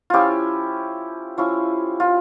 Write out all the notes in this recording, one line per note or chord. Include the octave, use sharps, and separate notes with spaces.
F3 C#4 E4 F4 G4
F3 C#4 E4
F4